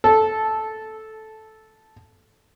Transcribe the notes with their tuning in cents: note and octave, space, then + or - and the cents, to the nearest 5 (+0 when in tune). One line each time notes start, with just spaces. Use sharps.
A4 -10